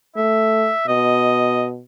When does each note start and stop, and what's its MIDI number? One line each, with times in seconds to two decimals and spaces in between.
0.16 0.71 57
0.16 0.84 76
0.88 1.82 47
0.88 1.67 75